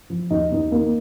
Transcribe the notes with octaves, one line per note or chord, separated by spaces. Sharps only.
F3
D#2 D#4
D#2
A#3